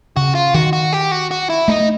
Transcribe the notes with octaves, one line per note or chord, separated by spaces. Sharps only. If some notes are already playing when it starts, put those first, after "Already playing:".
C#3 F#4
F4
D#3 F#4
F#4
G4
F#4
F#4
E4
A3 D#4